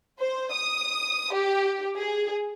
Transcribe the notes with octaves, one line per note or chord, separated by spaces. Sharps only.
C5
D#6
G4
G#4